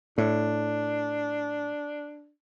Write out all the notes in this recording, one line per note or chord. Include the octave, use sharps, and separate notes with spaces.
A2 D4